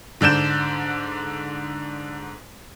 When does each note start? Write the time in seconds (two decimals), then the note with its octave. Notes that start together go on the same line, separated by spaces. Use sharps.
0.21 G#2 D3 D4 G6 E7